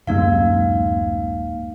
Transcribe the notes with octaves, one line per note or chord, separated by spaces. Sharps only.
D1 F#2 G#3 A#3 D#4 F5